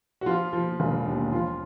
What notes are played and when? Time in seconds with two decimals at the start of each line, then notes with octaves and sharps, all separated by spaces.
0.21 F#4
0.26 F3 F4
0.53 F3
0.80 E1
1.06 D#2
1.32 F3 F4